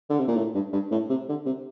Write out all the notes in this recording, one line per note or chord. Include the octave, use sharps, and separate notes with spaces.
D3
C3
A#2
A2
G2
G2
A2
C3
D3
C3